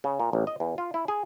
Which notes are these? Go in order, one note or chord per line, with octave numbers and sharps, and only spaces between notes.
C#3
A#2
A1
D#5
E2
F4
E4
G#4